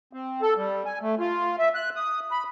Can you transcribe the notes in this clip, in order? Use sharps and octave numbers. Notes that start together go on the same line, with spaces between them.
C4
A4
G3
G#5
A3
F4
E5
F#6
D#6
B5